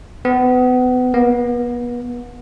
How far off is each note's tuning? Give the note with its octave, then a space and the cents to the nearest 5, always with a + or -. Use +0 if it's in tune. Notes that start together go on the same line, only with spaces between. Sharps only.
B3 +30
B3 -35